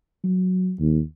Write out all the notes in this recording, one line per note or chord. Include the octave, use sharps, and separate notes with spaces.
F#3
D#2